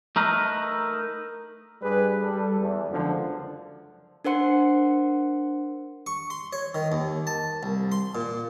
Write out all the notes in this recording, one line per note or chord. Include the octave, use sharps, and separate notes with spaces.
A3 D#4 A#4 B4
G2 G3 G#4 B4
G3 A4
E2
C#2 F#2 D3 F3
D4 A#4 C5 F#5 C6 C#7
C#6
C6
C#5
D#3
D#2
A5
C2
C6
A#2